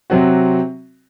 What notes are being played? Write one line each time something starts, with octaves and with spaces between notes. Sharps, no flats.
C3 F#3 C4 F#4